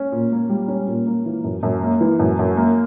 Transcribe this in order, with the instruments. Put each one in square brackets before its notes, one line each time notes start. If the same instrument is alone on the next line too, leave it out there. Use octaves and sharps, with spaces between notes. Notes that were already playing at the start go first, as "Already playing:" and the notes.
Already playing: [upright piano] C#4
A#2
A#3
G3
C#4
A#2
A#3
E3
F#2
F#2
A#3
E3
F#2
F#2
A#3